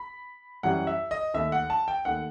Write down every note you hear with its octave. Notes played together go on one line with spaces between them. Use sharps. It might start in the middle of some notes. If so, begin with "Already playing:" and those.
Already playing: B5
F#2 E3 G3 F#5
E5
D#5
D#2 D#3 A3 E5
F#5
A5
G5
D#2 D#3 A3 F#5